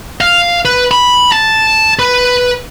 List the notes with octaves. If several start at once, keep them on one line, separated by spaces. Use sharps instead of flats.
F5
B4
B5
A5
B4